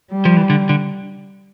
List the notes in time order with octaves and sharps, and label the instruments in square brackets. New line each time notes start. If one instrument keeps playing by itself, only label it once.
[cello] G3
[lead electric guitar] F3
E3
D3
D3